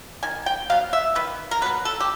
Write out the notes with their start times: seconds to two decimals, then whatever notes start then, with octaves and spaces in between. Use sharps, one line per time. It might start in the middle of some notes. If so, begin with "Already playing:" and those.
0.23 D#3 G#5
0.46 G5
0.70 F#3 B3 F5
0.93 E5
1.15 D#3 B4
1.51 A#4
1.62 F#3 B4
1.66 B3
1.85 A4
2.00 G4